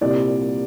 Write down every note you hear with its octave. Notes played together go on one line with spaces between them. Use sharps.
C2 A#2 G3 C4 D5